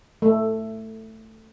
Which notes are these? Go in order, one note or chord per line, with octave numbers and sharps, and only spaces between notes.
A3